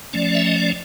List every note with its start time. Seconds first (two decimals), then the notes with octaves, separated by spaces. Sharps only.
0.13 F3 A3 C#4 D5
0.35 E5
0.46 D#5
0.56 D5